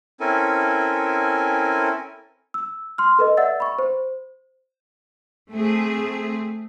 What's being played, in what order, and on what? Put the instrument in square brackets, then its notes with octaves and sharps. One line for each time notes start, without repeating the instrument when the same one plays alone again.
[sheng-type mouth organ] C4 C#4 E4 A4 A#4 G#5
[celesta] E6
C6 F6
A4 B4 D#5
D5 E5 F#5 E6 A6
B5 C#6
C5
[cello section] A3 C4 G#4